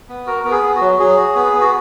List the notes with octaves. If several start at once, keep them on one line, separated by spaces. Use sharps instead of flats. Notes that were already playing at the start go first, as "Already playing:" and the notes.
B3
F#4 A#4
B3 A#4
G#4
B3
F#4
F#3
F#3 G#4
F#4
B3
B3
F#4